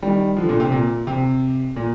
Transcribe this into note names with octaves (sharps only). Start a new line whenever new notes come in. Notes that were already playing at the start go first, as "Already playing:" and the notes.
D#3 G3
D3 F3
A#2 D3
C3
A#2
C3
A#2